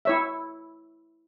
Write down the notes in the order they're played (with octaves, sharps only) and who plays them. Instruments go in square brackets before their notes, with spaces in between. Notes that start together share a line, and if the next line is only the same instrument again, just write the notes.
[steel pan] E4 C#5 E5